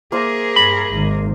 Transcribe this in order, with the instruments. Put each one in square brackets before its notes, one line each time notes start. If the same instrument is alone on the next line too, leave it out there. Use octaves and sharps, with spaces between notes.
[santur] A#3 C5 E5 [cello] G#4 A#4
[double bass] G2 [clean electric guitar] B5
[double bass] G#1 D#3